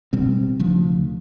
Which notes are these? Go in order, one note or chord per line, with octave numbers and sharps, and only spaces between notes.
B2 G3 C4
D2 C#3 F3